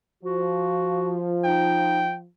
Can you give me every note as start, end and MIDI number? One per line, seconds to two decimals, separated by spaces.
0.23 2.26 53
0.23 1.17 66
1.44 2.04 63
1.44 2.17 79